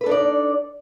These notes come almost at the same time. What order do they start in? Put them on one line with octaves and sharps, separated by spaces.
B4 A4 D4 D#4 D5